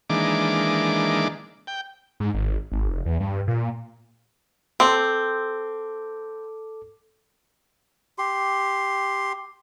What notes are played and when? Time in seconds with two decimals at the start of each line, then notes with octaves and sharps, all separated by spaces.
0.10 D#3 E3 G#3 A#3 D4 D6
1.67 G5
2.20 G#2
2.34 G#1
2.72 G#1
2.88 F1
3.05 E2
3.20 G2
3.48 A#2
4.80 C4 A4 D6
8.18 G4 C6